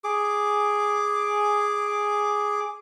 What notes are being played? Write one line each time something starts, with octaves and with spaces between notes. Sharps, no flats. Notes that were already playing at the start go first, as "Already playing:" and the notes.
G#4 D6